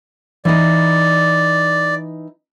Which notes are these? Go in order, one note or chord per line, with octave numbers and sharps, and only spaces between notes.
E3 D#4 D5 D#5